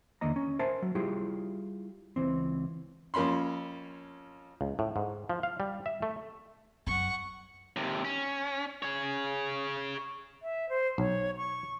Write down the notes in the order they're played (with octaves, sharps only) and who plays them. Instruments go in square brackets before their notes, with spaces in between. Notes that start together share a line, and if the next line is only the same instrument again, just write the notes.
[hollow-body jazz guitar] E2 D3 D#3 A#3 D#5 A#5
C#4
A#4 C5 E5 G#5 A5
F#3
G3 E4 F4 G4 G#4
C#2 E3 C4
[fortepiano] F2 A#3 C#4 B5 C6
[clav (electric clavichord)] C#2
A2
G#2
F3
F5
G3
E5
A3
[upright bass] F#2 [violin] F#5 C#6
[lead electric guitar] D#2 C3
C#4
G#4 C#5
[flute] E5
C5
[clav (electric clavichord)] B1 [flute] C#5
[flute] C#6